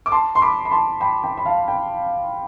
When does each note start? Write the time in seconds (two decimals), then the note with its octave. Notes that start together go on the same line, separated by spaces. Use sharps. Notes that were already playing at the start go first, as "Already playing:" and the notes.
0.06 D6
0.12 A5 C6
0.35 C6
0.42 B5 D6
0.65 B5
0.71 A5 C6
1.01 G5 B5
1.23 G5 B5
1.37 B5
1.46 F5 A5
1.68 G5 B5